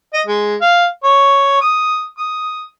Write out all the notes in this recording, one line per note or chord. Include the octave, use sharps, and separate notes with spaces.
D#5
G#3
F5
C#5
D#6
D#6